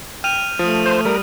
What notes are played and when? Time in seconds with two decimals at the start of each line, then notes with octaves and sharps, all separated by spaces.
0.24 G5 F6 D#7 F7
0.59 F3 A3 D#6
0.86 C5
1.05 G3 A#4